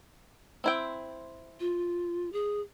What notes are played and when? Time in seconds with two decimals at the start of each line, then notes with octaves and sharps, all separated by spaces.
0.64 C4 E4 G5
1.60 F4
2.33 G#4